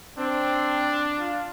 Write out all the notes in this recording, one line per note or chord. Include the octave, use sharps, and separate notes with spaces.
C4 D4
F4